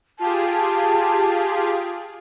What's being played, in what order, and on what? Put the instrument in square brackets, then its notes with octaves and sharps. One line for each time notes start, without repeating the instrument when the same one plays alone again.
[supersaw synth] F4 G4 G#4 [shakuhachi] A5